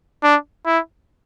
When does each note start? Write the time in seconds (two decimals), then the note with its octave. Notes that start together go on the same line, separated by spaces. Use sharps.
0.23 D4
0.66 E4